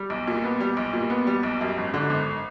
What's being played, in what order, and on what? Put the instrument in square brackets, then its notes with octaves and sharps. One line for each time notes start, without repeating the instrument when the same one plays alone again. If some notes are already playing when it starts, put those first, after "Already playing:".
Already playing: [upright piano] G3
B1
A#2
B3
G3
B1
A#2
B3
G3
B1
F#2
G#1
D3
G#1